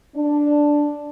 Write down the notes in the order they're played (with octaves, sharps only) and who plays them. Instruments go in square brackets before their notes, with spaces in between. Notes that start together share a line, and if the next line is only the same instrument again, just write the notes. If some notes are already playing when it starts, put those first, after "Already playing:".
[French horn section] D4